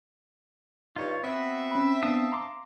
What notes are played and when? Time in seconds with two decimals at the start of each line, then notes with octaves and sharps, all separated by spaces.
0.96 G2 D#4 F4 C#5
1.24 B3 C4 F#4 E5
1.71 C#4 B5
2.03 B3 D4 F5 A5 D#6
2.32 A#5 C6 D6